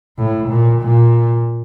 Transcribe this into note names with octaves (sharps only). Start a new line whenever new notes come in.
A2
A#2
A#2